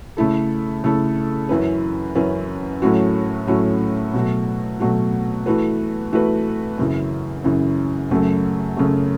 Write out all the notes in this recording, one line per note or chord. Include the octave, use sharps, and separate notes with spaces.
C#3 A3 E4 A4
C#3 A3 E4 A4
F#2 E3 C#4 E4 B4
F#2 E3 C#4 E4 B4
A2 F#3 A3 C#4 F#4
A2 F#3 A3 C#4 F#4
B2 F#3 A3 F#4
B2 F#3 A3 F#4
E3 A3 F#4 B4
E3 A3 F#4 B4
F#2 C#3 E3
F#2 C#3 E3
F#2 C#3 F#3 A3
F#2 C#3 F#3 A3